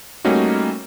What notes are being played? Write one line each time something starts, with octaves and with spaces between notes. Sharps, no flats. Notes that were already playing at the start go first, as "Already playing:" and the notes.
G3 A3 A#3 C#4 D#4 F#4